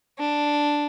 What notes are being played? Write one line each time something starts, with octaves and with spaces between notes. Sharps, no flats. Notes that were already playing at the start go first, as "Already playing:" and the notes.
D4